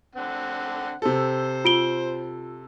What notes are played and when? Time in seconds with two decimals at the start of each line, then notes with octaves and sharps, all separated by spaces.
0.16 D3 C4 F#5
1.02 C3 A4 C5
1.65 F4 D7 G7